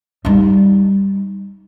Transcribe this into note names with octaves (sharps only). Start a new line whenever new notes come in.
G3 D#4